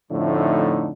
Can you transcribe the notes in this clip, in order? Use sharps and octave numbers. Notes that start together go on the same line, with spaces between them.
F2 A2 D3 F3 A3 D#4